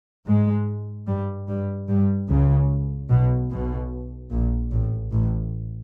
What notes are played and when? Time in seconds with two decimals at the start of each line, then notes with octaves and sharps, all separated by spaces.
0.27 G#2 G#3
1.07 G2 G3
1.48 G2 G3
1.88 G2 G3
2.28 C#2 C#3
3.10 B1 B2
3.50 B1 B2
4.31 A#1 A#2
4.71 A1 A2
5.12 A1 A2